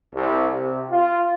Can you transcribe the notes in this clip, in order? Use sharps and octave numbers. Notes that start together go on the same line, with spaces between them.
C2
C3
F4